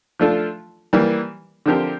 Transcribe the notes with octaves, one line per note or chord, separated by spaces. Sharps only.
F3 A3 D4 F4 A4
E3 G3 A#3
D3 F3 C4 G4 A#4